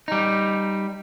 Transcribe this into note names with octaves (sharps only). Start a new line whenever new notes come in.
G3 D#4